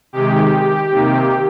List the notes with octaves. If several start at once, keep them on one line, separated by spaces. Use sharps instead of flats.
C3 D#3 G#3 G4
C3 D#3 A#3